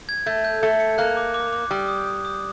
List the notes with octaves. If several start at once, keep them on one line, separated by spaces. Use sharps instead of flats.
G#6
A3 G6
G6
A3 C#7
C#7
A#3 F#6
D6
D6
D6
G3 D#6
D#6
D#6
D#6